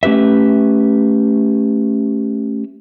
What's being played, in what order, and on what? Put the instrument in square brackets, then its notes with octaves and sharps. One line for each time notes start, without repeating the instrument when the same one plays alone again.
[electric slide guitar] A3 C#4 G4 B4 E5